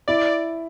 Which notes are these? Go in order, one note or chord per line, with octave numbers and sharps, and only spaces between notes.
E4 D5